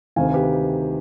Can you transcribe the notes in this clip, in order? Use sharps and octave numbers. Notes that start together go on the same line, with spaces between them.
D2 C3 D#3 F5 G#5
G4 B4